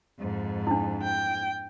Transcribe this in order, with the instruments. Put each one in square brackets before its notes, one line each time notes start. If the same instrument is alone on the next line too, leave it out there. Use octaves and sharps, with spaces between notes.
[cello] F2 G#2
[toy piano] D4 E4
[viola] G5